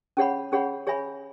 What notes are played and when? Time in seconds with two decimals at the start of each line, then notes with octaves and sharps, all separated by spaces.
0.17 C#4 G#4 C#5 F#5 B5
0.52 C#4 G#4 C#5 F#5 B5
0.87 G#4 C#5 E5 G#5 B5